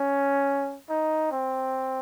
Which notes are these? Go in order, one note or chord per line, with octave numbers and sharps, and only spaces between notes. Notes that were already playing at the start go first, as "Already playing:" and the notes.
Already playing: C#4
D#4
C4